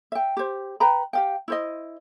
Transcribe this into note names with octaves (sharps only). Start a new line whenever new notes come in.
E5 G5
G4 C5
B4 G5 A#5 B5
G4 F5 G5
E4 C5 D#5